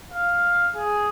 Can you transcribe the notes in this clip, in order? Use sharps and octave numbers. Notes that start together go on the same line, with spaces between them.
F5
G#4